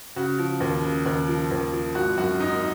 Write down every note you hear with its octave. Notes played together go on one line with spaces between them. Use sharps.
C#3 F#4
F3
D#2
C#3
D#2
F3
D#2
F3
G#1 F#4
F#2 F#4
G#1 D#4